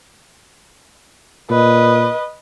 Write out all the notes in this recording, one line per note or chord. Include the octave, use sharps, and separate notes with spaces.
A#2 B4 D#5